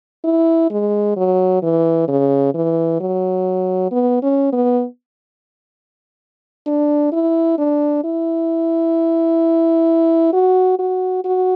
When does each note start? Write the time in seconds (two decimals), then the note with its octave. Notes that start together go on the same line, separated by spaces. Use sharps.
0.25 E4
0.71 G#3
1.17 F#3
1.63 E3
2.08 C#3
2.54 E3
3.00 F#3
3.92 B3
4.23 C#4
4.52 B3
6.67 D4
7.13 E4
7.58 D4
8.04 E4
10.33 F#4
10.79 F#4
11.25 F#4